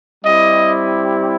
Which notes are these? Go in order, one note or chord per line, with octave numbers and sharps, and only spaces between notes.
G3 C4 E4 G4 D#5